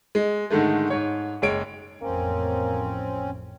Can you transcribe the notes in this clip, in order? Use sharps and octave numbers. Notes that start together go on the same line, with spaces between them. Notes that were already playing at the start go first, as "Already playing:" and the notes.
G#3
G#2 D3 D#3 G#3 A3
G#2 C#5
F#1 G#3 C#5 D7
A1 F2 A#3 C4 C#4